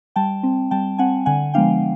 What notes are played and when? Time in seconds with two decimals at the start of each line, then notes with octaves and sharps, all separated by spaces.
0.16 G3 G5 A5
0.43 C4
0.71 G3 G5 A5
0.98 C4 F#5 G#5
1.26 D3 F#5 G#5
1.54 F3 G#3 B3 D4 F5 G5